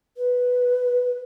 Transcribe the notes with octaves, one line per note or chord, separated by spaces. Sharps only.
B4